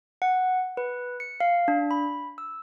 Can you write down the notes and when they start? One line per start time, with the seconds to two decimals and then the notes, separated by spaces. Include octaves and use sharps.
0.22 F#5
0.77 B4
1.20 C#7
1.40 F5
1.68 D4
1.91 B5
2.38 E6